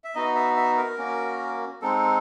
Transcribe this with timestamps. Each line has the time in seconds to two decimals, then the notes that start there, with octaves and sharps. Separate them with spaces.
0.04 E5
0.15 B3 D#4 F#4 D#5
0.35 E5
0.57 E5
0.77 A#4
0.98 A#3 C#4 F#4
1.82 G#3 C4 D#4 A4